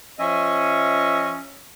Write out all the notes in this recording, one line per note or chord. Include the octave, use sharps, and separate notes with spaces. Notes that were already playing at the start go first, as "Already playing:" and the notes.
F3 C#4 D#5 E5